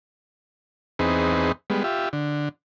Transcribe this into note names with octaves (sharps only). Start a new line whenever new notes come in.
E2 C4 D#4 G#4 B4
G3 G#3 B3
F4 G4 E5
D3